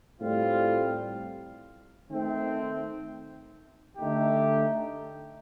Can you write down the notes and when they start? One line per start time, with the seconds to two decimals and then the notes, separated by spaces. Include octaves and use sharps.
0.20 A2 G3 C4 F4
2.08 D#3 A3 C4
3.98 D3 A3 D#4 G4